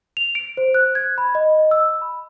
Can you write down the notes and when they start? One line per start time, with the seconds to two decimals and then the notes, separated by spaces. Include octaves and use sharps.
0.17 F7
0.35 D7
0.57 C5
0.74 F#6
0.95 G#6
1.18 B5
1.35 D#5
1.58 D#5
1.71 E6
2.02 B5